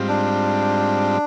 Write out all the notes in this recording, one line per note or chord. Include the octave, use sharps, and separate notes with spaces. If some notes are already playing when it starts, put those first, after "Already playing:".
Already playing: G#2 G3 C4 F4
D4